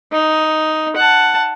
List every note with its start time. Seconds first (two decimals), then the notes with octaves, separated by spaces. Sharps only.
0.12 D#4
0.96 F#5 A5